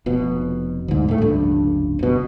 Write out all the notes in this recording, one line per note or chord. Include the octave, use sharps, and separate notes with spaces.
F1 B2
D2 G#2
A2 A3
F1 C#2 G2
F#1 B2